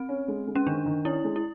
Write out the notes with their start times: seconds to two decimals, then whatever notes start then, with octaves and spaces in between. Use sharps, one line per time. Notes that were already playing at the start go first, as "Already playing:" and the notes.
Already playing: C4
0.09 C#4
0.28 G#3
0.47 G#3
0.55 C#4
0.67 D#3 D4
0.86 D#3
1.05 C#4 E4
1.24 G#3
1.36 E4